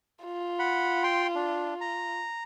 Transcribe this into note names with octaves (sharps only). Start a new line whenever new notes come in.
F4
F#5 B5
G5 C6
D4
A#5